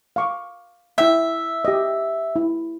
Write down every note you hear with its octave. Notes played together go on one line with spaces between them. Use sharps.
F5 C#6 D6
E4 E5 G5 E6
G4 D#5
E4